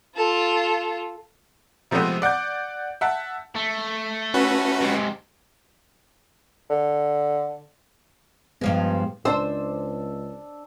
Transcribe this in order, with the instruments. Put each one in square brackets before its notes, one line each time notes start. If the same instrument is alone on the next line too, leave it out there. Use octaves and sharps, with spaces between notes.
[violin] F4 A4
[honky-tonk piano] C3 F3 G#3 A3 B3 C4
D5 F#5 D6 G6
E5 F#5 A5
[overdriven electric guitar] A3
[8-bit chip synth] C#4 F#4 B4
[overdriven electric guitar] G#2 C3
[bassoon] D3
[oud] G2 F3 G#3 [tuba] B3
[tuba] C#2 [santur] D4 E6 [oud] C5